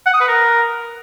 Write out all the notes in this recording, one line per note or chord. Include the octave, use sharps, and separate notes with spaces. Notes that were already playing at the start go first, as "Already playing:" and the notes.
F#5
D#6
B4
A#4